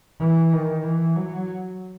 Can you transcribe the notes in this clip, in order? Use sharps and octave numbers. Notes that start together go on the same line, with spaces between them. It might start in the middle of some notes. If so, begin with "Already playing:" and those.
E3
D#3
E3
F#3